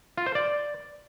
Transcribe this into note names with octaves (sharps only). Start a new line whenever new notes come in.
F4
C5
D5